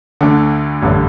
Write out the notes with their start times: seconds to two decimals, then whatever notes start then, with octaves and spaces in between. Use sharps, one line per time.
0.21 D2 D3
0.82 A1 G2 D3